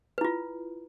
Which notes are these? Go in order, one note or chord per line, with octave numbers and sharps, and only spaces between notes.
E4 F4 B4